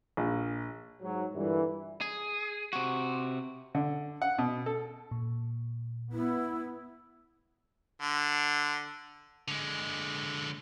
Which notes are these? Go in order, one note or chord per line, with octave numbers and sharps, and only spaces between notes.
A#1
G#2 F#3
G2 A#2 D3 E3
G#4
C3 F#4
D3
F#5
B2
A4
A#2
B3 E4
D3
D3 G#3